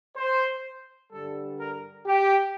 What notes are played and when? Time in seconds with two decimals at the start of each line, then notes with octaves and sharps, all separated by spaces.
0.16 C5
1.11 G2 D3 G3 A4
1.58 A#4
2.06 G4